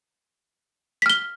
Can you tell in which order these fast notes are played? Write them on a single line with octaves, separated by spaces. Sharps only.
B6 F6 G7